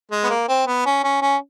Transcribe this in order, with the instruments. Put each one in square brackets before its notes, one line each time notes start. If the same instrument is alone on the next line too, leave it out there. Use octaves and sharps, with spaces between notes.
[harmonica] G#3
B3
A#3
C4
B3
C#4
C#4
C#4